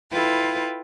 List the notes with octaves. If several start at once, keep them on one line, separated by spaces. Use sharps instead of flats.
E4 F4 A4 B4 G5